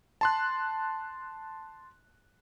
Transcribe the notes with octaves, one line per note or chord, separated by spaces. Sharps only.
A5 C6 F#6